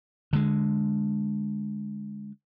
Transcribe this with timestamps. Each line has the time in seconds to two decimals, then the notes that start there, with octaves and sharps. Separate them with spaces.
0.33 D3 G#3